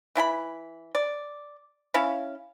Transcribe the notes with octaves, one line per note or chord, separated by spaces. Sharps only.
E3 E4 G#5 B5
D5
C#4 E4 C#5 F5